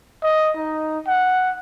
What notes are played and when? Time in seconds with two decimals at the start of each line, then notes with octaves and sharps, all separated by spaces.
0.23 D#5
0.56 D#4
1.07 F#5